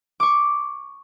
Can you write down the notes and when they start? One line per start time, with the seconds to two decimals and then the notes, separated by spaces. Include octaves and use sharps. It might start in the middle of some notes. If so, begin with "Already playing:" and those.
0.20 C#6 D6